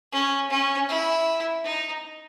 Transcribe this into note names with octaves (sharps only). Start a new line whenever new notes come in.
C#4
C#4
E4
D#4